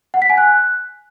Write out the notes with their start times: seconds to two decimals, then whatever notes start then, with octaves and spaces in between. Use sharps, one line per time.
0.14 F#5
0.22 B6
0.30 G#5
0.38 F#6